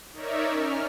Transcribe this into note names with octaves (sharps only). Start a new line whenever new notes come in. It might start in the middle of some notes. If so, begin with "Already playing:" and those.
D#4 A#4 C#5 D5 E5
C#4 F6